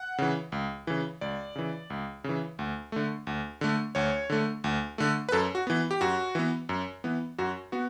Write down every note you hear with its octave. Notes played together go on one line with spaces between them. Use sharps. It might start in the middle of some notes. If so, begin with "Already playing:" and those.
Already playing: F#5
C#3 E3
C#2
C#3 E3
C#2 D5
C#3 E3
C#2
C#3 E3
D2
D3 A3
D2
D3 A3
D2 C#5
D3 A3
D2
D3 A3
B4
F#2 A4
F#4
E3 B3
G4
F#2 F#4
E3 B3
F#2
E3 B3
F#2 F#4
B3 F#4